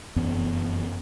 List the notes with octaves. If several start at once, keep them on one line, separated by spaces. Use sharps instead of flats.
F1 F#2 E3 B3